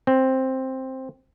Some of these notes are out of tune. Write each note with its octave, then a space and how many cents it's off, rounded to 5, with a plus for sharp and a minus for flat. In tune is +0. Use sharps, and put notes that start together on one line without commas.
C4 +5